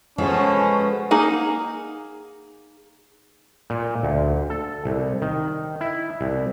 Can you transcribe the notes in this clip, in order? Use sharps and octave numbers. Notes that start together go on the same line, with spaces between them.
B2 F3 G#3 C#4 A4
A#3 D#4 G#4 F#5
A#2
D2
A4
C2
D#3
E4
C2